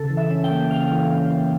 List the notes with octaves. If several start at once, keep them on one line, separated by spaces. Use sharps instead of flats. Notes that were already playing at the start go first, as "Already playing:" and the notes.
Already playing: C#3 A4
E3
E5
C#4
G5
A#3
C#3 F5
E3
C#4
A#3